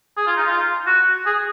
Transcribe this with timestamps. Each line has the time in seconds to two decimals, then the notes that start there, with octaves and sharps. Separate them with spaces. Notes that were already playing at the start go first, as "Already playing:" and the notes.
0.17 G#4
0.27 F4
0.37 D#4
0.47 F4
0.87 F#4
1.26 G#4